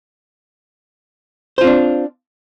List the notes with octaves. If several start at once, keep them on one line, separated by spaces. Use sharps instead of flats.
C4 D4 F4 C5